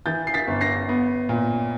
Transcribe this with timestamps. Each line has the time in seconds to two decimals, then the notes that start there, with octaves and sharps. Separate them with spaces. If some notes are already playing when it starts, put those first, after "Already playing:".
0.06 E3 G6 A6
0.27 C7
0.34 A6 B6
0.47 G1
0.61 A#6 C7
0.89 B3
1.29 A#2